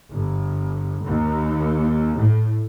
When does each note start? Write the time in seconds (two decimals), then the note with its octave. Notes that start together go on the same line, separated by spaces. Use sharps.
0.13 G1
1.06 D#2
2.17 A2